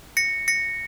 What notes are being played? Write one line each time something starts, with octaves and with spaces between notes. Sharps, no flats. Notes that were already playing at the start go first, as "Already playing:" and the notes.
A#6 C#7
A#6 C#7